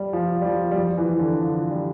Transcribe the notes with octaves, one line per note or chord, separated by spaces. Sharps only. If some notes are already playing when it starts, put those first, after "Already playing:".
Already playing: G3
F3
G3
F3
G3
F3
E3
D3
F3
G3